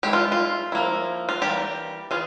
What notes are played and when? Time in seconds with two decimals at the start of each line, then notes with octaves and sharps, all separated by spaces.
0.03 G#3 E4 G4
0.13 F4
0.32 F4
0.72 F3 A#3 E4
1.29 F4
1.42 E3 G3 A#3 G4
2.11 E3 F4 G#4